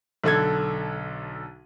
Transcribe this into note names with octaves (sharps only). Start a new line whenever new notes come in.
B1 D3 A4 G#6